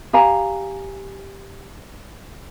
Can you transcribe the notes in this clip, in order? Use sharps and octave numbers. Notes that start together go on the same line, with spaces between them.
G4 F5 G#5 A#5